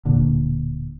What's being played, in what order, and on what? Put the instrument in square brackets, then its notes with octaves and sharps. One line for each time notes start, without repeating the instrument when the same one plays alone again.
[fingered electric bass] D1 A#2 D3